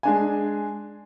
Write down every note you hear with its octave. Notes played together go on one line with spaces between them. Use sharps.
G#3 D4 G#5